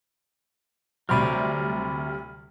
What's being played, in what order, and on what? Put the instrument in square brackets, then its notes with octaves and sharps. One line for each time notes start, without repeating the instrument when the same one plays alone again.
[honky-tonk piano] D2 C3 G3 [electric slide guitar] F#3 C5 D5 [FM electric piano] B5 F6